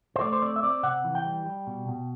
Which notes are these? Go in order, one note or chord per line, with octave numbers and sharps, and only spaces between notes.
C5
A3 D5
C5
C4 D5
E5
C4 D5
C3 F#5
E3
G5
G3
G3
B2
B2